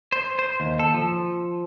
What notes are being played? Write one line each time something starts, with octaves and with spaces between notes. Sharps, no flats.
C5
C5
D#2
A4
F3